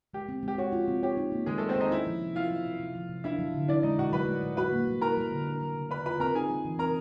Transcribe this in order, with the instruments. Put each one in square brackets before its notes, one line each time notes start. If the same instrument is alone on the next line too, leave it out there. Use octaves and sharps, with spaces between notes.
[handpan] G#3 [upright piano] G4
[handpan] C4
[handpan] G#3 [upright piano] G4
[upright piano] F#4 [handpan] C#5
[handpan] F4
C4
[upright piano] G4 [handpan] C#5
[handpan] D#4
A#3
[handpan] D#3 [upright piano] G#3 G#4
[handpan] F#3 [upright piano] A3 A4
[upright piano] C4 C5
[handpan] D#3 [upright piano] D#4 D#5
[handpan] C#4 [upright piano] E4 E5
[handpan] F3
C3
[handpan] E4 [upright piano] F4 F5
[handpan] F#3
B2
C3
F3
C3
[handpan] D4 [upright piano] E4 E5
[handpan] F#3
D3
[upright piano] D4 D5 [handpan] E4
[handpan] G#3 [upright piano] D#4 D#5
[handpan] B2 [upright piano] F#4 F#5
[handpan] F#3 [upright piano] B4 B5
[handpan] A3
F#3
[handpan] F#4 [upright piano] B4 B5
[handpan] A#3
G3
[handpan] E4 [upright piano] A#4 A#5
[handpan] G3
D3
D4
F#3
C#3
[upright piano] B4 B5 [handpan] D5
[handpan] F4 [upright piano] B4 B5
[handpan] C4 [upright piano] A#4 A#5
[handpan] D#4 [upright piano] G#4 G#5
[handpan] G3
E3
[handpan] C4 [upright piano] A#4 A#5